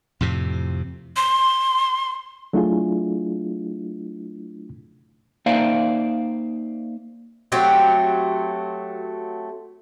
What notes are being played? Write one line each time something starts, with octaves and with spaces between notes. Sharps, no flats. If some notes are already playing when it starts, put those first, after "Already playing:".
F2 A2 C3
C6
F#3 A3 D4 E4 F4 G#4
A#3 D#4 C5 D5 E5 F5
F#3 A3 C4 G4